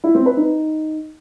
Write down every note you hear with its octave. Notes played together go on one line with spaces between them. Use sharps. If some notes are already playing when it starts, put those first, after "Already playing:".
E4
C4
B4
D#4